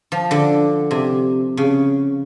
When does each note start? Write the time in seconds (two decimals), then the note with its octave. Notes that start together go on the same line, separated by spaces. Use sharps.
0.12 F3
0.31 D3
0.91 C3
1.57 C#3